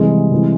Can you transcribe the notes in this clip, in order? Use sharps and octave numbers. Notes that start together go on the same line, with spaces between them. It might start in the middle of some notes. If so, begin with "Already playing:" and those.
Already playing: C3 E3 G3 G#3
C3 E3 G3